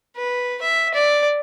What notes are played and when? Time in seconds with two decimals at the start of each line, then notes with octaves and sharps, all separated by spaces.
0.17 B4
0.62 E5
0.95 D5